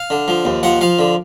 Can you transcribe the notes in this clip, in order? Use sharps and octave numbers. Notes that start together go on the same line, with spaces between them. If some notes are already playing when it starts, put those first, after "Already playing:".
Already playing: F5
D3
F3
D#2
F3 F#5
F3 F5
D3